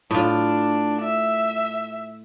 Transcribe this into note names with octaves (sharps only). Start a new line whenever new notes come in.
A2 D4 F4
E5